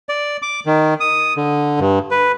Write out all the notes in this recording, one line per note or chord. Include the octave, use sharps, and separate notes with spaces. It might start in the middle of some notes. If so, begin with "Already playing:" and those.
D5
D6
D#3
D#6
D3
G2
B4